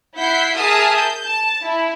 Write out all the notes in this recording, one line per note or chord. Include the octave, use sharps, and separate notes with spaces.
E4 F#5 G6 B6 C7
G#4 A#4 E5 A5 D#6 F6
G6
A5
E4